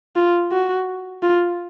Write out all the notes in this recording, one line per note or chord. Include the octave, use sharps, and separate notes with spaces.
F4
F#4
F4